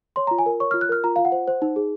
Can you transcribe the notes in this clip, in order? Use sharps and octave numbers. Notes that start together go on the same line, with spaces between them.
C#5 C6
A#5
F4
G#5
A#4
C#5 C#6
F6
F4
F#6
A#4 F6
F4 A#5
F4 F5
F#5
C5
C5
D#4
G#4